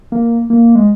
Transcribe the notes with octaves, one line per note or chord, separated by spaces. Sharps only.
A#3
A#3
G#3